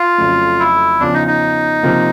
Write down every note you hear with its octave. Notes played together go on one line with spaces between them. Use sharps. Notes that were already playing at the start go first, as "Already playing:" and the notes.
Already playing: F4
F2 C#3 F#3 A3
E4
E2 C#3 F3 D4
D#4
D#4
C3 F3 A#3